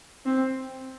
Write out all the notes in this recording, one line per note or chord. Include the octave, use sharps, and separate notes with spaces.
C4